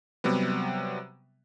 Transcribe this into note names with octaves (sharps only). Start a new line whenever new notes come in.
C3 F#3 G3 B3